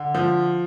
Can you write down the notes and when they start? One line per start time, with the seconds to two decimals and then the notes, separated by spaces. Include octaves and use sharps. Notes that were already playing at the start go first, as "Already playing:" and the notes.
Already playing: D3
0.15 F3